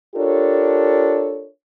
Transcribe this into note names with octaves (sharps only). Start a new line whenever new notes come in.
D4 F4 G4 A4 A#4 C#5